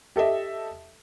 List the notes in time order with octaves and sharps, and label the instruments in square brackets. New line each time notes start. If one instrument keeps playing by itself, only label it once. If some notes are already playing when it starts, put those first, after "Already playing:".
[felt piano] G4 A4 D#5 E5